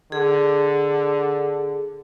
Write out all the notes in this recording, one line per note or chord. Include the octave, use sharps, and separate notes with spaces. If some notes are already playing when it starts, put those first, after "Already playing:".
D3 G#4